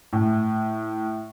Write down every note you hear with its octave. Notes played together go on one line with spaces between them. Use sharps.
A2